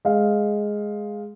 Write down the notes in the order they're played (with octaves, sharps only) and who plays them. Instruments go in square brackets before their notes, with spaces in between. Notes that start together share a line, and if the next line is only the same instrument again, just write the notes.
[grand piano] G#3 F5